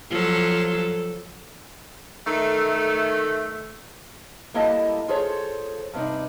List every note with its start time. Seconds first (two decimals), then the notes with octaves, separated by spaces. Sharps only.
0.11 F3 F#3 A4
2.27 D#3 A3
4.54 G3 A#3 E4 A4 D#5 A5
5.08 F4 G#4 A4 C5 C#5
5.93 G2 C3 D4 D#4